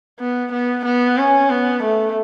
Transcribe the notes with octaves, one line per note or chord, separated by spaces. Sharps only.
B3
B3
B3
C#4
B3
A3